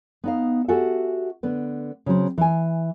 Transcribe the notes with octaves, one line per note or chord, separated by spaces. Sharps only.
B3 D#4 F5
F#4 G4 A4 E5 F#5 G#5
D3 B3 B4
C#3 F#3 C4
E3 G#5